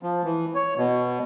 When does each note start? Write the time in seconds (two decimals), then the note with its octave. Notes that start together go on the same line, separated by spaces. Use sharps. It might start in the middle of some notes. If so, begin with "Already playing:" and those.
0.03 F3
0.24 E3
0.55 C#5
0.78 B2